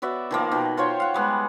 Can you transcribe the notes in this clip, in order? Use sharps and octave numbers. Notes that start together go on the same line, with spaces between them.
B3 F#4 D5 E5
D#3 F3 A#3
B2 D#3
F4 C5 C#5 G5
F5 F#5
G3 G#3 B3